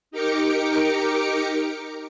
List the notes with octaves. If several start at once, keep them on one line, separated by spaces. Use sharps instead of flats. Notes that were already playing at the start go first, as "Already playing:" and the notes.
D#4 G4 A#4 G5 D6 C#7